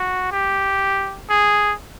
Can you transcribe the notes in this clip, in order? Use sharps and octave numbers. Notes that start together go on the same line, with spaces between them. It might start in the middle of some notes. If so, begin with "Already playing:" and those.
Already playing: F#4
G4
G#4